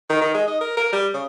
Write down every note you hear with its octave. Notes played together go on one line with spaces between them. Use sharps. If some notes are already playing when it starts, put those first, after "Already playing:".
D#3
D#3
G#3
D#4
A#4
A#4
G3
C#3